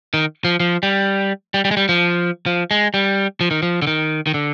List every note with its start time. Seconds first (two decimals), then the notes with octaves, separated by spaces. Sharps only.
0.14 D#3
0.45 F3
0.60 F3
0.83 G3
1.54 G3
1.65 G3
1.71 G#3
1.77 G3
1.89 F3
2.46 F3
2.71 G#3
2.94 G3
3.41 F3
3.51 D#3
3.62 F3
3.82 D3
3.87 D#3
4.27 D#3
4.34 D3